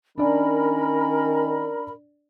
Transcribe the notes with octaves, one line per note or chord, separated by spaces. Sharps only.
D#3 C#4 D4 A#4 D5 B5